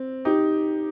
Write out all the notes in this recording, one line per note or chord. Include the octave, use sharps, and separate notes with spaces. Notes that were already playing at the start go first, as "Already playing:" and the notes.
Already playing: C4
D#4 G4